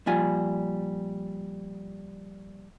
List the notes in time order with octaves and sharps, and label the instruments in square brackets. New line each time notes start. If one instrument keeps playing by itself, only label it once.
[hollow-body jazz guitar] A#2 F3 G3 F4 G#5